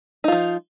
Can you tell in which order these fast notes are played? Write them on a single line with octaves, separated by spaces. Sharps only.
D#4 F4 F3